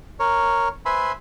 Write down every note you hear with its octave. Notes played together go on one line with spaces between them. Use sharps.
A#4 C#5
B4 C5 E5 G#5 B5 C6